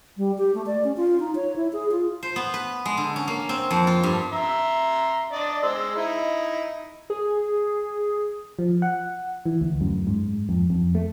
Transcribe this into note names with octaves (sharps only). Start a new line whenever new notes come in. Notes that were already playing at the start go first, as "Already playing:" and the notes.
G3
G4
A3
D5
C#4
F4
D#4
C#5
E4
G#4
F4
C5
B3
B4
G#3
D3
C#4
A#3
C4
F2
F4
G2
E5 A#5 C6
D4 D5 D#5
G#3 C5 E6
D#4 E4
G#4
F3
F#5
E3
D2
F#2
G#2
F2
F2
A3